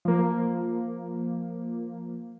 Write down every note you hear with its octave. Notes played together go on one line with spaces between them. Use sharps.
F3 A#3